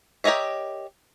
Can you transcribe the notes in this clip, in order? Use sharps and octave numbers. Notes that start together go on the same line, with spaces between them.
G4 A#4 C#5 D#5 E5